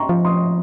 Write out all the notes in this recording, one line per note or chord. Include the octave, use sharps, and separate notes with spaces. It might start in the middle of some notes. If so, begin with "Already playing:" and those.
Already playing: A#5 C6 C#6
F3
C6 D#6